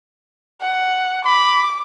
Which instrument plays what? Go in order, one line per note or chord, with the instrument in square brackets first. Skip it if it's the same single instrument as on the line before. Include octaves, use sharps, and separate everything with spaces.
[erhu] F#5
[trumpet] B5 [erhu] D6